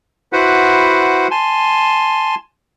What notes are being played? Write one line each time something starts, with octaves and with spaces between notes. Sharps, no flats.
E4 F#4 B4 C5 F#5
G#5 A5 C6